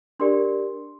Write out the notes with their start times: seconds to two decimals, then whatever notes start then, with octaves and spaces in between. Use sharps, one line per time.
0.20 D4 G4 A#4 D5 C6